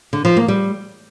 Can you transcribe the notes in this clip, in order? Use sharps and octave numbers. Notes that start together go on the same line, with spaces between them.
D3
F3
A#3
G3